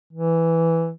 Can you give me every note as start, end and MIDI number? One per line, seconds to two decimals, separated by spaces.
0.13 0.91 52